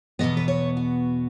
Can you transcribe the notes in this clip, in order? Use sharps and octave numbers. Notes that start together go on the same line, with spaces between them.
E2 B2 G#3 B3 D#5
B4
C#5
F#4